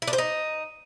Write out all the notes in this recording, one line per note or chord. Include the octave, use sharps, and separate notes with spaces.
E4
D4
C5
D#4